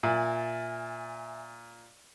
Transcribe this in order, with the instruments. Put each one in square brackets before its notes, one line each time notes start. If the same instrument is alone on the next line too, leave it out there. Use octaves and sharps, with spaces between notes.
[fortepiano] A#2 [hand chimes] E5 G#5 A6